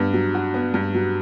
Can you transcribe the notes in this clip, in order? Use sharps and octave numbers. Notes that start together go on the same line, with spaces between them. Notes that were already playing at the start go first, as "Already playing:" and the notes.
Already playing: G2 B3
F#3
F#4
B3
G2
F#3